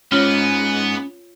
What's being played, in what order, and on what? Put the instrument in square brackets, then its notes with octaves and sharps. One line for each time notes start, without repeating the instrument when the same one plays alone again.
[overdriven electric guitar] G#2 [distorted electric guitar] B3 [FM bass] C#4 [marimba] F4 C#5